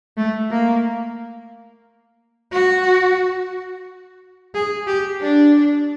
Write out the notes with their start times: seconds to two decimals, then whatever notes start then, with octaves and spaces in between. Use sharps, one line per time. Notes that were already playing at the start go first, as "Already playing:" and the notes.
0.17 A3
0.51 A#3
2.52 F#4
4.55 G#4
4.87 G4
5.21 D4